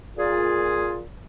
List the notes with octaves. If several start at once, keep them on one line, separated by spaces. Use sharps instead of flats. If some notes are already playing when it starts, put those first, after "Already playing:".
A#2 F4 G#4